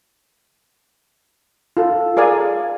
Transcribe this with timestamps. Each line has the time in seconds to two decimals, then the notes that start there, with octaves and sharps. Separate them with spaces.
1.77 F4 A4
2.17 G#4 A#4 D5 F5 G#5